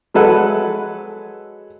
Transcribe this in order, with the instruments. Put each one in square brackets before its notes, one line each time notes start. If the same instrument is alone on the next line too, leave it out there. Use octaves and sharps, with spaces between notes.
[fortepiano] F#3 G#3 A4 B4 F#5